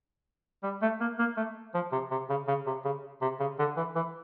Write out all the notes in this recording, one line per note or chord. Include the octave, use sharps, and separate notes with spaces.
G3
A3
A#3
A#3
A3
F3
C3
C3
C#3
C#3
C3
C#3
C3
C#3
D3
E3
E3